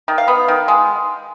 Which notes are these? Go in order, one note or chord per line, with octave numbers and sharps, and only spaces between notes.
D#3
F5
B3
D#3
G#3